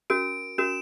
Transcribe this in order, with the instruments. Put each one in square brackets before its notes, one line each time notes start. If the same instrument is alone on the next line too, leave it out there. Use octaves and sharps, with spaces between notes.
[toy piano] C#4 F#4 A#4 [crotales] D7
[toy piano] C#4 F#4 A#4 [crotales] E7